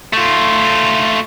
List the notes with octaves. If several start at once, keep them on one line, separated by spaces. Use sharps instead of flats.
A3 F4